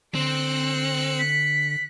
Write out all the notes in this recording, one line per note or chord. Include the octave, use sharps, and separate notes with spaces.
D3 C4 F#6 C#7
B6